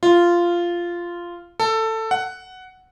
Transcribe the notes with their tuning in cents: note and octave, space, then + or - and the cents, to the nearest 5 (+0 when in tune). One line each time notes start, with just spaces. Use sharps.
F4 -10
A4 +15
F#5 +5